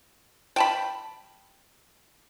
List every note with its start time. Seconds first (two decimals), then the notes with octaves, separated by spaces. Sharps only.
0.56 G5 A5 B5